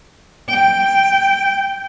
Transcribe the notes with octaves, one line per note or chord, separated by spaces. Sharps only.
G5